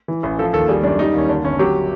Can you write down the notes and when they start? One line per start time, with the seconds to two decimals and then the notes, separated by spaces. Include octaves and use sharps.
0.08 E3
0.23 A1
0.39 F3 A4
0.53 D#2 A4
0.68 G3 G#4
0.83 F#2 D4
0.99 G3 D#4
1.14 D#2 C#4
1.29 D3 D4
1.44 G1 C#4
1.59 F#3 G4